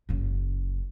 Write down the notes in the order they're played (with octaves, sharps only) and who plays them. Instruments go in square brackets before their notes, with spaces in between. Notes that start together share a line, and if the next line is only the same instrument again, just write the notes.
[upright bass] F#1 C#3